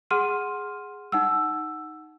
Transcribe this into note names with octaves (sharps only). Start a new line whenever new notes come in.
G#4 F#5 C6 F6 D#7
D#4 F#5 E6